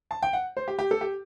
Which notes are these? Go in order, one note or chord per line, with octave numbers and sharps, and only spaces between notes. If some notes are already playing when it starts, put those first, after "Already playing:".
A5
G5
F#5
C5
G4
G4
A4
G4